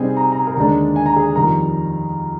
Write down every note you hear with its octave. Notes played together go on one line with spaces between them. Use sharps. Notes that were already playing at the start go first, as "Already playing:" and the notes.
Already playing: C3 G3 C4 D#4 G#4 G#5
A#5
A#5
A#4 A#5
D#2 D3 G#3 D4 A#4 A#5
G#5
A#5
G#4 G#5
F2 D#3 G3 A#4 A#5